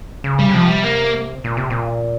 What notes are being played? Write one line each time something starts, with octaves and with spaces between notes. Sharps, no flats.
C#3
G3
C#3
C3 F3
G3
A#3
A#2
C3
A#2